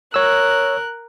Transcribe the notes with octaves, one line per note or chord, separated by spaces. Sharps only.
A#4 C#5 E6 F#6